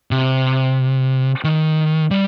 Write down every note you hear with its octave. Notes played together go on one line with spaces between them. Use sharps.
C3
D#3
G3